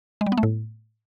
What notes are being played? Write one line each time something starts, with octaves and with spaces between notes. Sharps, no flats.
G#3
G3
B3
A3
A2